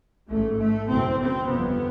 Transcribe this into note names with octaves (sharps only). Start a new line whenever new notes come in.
A1 G#2 A3
A3
F#1 E2 B2 C4
C4
G1 F2 C3 B3